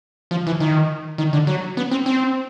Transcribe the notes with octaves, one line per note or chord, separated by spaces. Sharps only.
F3
E3
D#3
D#3
D3
F#3
B3
C4
C4